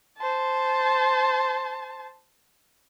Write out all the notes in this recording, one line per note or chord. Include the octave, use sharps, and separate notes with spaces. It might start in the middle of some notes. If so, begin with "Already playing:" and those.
C5 A5